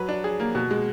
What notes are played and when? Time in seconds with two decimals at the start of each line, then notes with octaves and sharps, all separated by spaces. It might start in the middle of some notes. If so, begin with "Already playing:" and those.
Already playing: F#3 B4
0.09 D4
0.24 G#4
0.40 A#3
0.55 B2
0.71 G#3